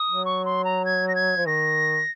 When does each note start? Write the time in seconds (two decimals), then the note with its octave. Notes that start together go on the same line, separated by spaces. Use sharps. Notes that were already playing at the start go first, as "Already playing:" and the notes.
Already playing: D#6
0.09 F#3
0.25 C#6
0.45 C6
0.64 A#5
0.85 G#6
1.08 A#6
1.15 G#6
1.37 F3
1.46 D#3 A#6